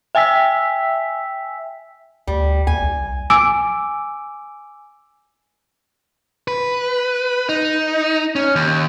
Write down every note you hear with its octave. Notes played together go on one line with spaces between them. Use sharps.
E5 G5 G#5 E6 B6
D2 G3
D#2 G#5
C2
G#5 D6 E6 D7
B4
D#4
C#4
D#2